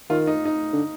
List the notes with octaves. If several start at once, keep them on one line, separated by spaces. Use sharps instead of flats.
D#3 F4
D#4
D#4
D3